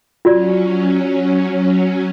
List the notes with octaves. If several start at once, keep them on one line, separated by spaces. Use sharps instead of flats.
F#3 C#4 F4 F#4 D5